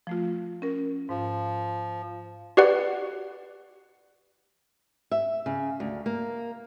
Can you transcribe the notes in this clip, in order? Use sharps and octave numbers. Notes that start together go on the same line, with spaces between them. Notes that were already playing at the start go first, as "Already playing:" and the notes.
F3 A3 F4
C#4 A#4
G#2 F3
F#4 G4 B4 D5 F#5
E5
C#3
D2
A#3